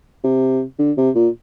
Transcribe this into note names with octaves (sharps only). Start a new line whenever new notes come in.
C3
D3
C3
A#2